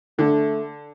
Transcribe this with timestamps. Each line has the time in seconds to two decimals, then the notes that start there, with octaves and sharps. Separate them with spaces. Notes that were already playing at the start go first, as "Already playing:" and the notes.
0.19 D3 A3